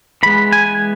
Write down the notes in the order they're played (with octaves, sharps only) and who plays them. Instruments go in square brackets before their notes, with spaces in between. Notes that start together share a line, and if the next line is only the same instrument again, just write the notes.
[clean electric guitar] E3 G#3 B3 B5
G#5